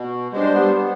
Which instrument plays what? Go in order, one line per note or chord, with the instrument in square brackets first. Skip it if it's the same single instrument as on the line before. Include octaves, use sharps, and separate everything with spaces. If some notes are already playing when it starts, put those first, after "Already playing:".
Already playing: [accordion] B2
[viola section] G3 D4 G4 C5 [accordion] G#3
[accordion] B3
B3